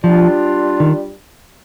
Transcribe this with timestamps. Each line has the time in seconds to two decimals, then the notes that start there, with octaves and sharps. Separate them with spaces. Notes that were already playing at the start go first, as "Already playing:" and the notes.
0.03 F3 G3 D4 F4
0.80 D#3